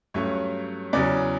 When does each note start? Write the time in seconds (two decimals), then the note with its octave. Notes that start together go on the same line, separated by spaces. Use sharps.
0.14 G2 F#3 A3 C#4 C#5
0.93 E2 C#3 F#3 D5